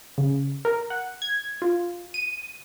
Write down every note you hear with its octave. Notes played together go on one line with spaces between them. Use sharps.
C#3
A#4
F#5
G#6
F4
D#7